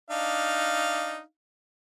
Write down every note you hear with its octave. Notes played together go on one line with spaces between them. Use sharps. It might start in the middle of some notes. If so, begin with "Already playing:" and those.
D4 D#4 F5